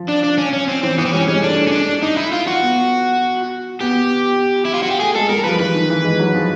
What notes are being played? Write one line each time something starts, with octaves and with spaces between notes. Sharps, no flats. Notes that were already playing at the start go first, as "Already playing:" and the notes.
Already playing: F3
D4
D4
C#4
C#4
C4
E3 C4
E3 B3
C4
G3 C#4
G#3 C#4
A3 D4
C#4
D4
D#4
E4
F4
F#4
B3
B3 G4
E4
F4
F#4
G4
A3 G#4
G#3 A4
G3 A#4
F3 B4
E3 B4
D#3
E3
G#3
F#3
F3